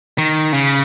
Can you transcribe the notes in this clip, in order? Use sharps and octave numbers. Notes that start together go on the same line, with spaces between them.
D#3
C#3